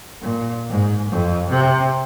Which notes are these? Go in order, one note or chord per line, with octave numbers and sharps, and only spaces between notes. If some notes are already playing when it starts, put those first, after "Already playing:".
A#2
G#2
F2
C3